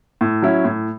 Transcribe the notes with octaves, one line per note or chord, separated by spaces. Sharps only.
A2
F#3 C#4 E4
A2